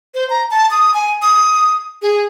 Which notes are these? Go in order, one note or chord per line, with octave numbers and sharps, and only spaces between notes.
C5
A#5
A5
D#6
G#5
D#6
G#4